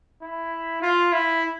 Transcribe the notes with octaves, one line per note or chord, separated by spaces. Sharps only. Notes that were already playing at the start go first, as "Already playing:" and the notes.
E4
F4
E4